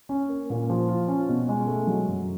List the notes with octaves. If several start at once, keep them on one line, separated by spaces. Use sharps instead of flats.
C#4
A#3
A#2
F3
F4
C#4
B2
G#3
A3
F#3
F#2